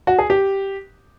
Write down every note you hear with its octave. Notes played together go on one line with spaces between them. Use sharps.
F#4
G#4
G4